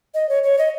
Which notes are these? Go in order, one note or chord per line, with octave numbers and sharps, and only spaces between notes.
D#5
C#5
C#5
D#5